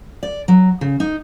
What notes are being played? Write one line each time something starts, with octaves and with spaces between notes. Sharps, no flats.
D5
F#3
C#3
D#4